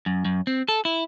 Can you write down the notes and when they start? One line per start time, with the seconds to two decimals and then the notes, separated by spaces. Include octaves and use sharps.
0.06 F#2
0.25 F#2
0.47 C4
0.68 A4
0.85 E4